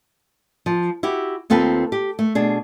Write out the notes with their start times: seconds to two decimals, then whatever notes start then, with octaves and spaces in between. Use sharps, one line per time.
0.66 F3
1.03 E4 F#4 G4
1.50 D#2 C4 F4 A4 B4
1.92 G4
2.19 A3
2.35 B2 D4 G#4